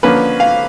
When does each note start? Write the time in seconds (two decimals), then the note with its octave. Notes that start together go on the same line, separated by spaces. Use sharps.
0.03 D3 F3 A#3 C#4 B4
0.40 F5